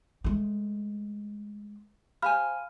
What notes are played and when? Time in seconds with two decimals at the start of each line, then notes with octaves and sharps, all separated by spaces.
0.24 G#3 A3
2.22 G4 C5 F5 G#5 B5 F6